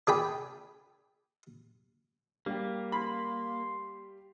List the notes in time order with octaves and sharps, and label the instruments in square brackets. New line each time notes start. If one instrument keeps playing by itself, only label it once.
[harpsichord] D4 G#4 G5 B5
[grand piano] G3 G4 [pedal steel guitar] A#3
[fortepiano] B5 [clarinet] C6